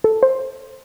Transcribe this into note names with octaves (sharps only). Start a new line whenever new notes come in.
A4
C5